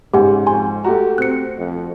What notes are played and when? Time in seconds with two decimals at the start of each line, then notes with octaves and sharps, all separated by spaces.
0.14 G#2 C#3 G4 F#5 G#5
0.47 F2 G#5 C6
0.84 A3 F#4 G4 A#5
1.18 C4 F#6 C#7
1.58 F2